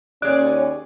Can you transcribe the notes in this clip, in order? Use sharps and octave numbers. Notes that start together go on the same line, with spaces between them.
D#2 C#4 G#4 D5 F#6